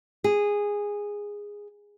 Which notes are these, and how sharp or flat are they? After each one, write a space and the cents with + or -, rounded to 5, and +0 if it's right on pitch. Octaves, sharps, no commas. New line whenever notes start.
G#4 -10